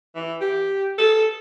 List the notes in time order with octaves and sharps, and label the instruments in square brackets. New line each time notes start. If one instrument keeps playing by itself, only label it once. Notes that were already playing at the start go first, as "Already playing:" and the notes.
[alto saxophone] E3
G4
A4